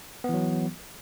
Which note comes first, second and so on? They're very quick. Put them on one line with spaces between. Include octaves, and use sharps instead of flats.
B3 E3 F#3